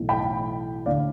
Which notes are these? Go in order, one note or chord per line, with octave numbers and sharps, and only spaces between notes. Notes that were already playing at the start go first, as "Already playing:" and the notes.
Already playing: B1 A2 E3
G5 B5
D2 D3 D5 F5